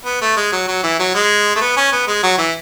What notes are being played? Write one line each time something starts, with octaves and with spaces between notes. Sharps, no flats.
B3
A3
G#3
F#3
F#3
E3
F#3
G#3
A3
B3
C#4
B3
G#3
F#3
E3